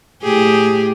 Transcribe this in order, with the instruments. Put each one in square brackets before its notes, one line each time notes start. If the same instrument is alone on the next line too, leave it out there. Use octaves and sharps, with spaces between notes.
[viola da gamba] A2 G4 G#4